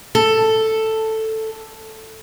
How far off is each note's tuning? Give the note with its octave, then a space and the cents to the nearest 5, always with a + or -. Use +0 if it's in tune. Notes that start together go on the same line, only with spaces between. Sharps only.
A4 +5